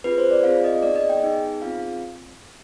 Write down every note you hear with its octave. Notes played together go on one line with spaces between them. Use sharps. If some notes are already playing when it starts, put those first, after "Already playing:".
C4 F4 G#4 B4
C5
D5
C4 F4 G#4 F5
D#5
B3 D#4 G#4 D5
D#5
G5
B3 D#4 G#4
C4 F4 G#4 F5